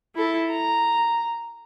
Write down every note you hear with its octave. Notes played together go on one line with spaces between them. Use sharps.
E4 A4
A#5